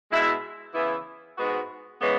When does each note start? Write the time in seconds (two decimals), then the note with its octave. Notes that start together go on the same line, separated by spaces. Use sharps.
0.10 B2 G#3 E4
0.74 C#3 E3 B3 E4
1.37 G#2 G#3 B3 F#4
2.00 C#3 E3 G#3 B3